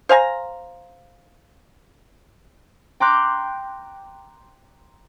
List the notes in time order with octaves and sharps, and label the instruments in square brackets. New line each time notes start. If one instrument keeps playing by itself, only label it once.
[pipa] C5 F5 G#5 A#5
[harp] G5 A#5 C6 D6 F#6 G6